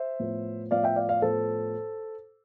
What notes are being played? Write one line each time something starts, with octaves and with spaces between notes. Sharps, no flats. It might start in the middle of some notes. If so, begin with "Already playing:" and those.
Already playing: C5 E5
A2 F3 B3
A2 F3 B3 D5 F5
E5 G5
D5 F5
D5 F5
A2 F3 B3 A4 C5